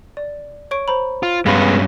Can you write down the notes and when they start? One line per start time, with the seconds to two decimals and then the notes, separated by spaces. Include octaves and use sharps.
0.17 D5
0.71 C#5 C#6 D7
0.88 C5 A#5 B5
1.23 F4
1.46 G2 G#3 B3 C#4 F5 B5 C6